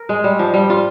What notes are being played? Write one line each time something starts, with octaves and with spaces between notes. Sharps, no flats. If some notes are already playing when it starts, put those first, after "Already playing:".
Already playing: A#4
G#3
G3
F3
G3
F4